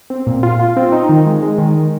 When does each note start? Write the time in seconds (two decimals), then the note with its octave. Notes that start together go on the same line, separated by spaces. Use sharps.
0.10 C4
0.27 A#2
0.43 F4
0.60 F4
0.77 C4
0.92 D#4
1.09 D#3
1.26 G#3
1.42 G#3
1.58 D#3